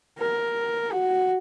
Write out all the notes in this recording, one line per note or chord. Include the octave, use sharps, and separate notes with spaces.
A#4
F#4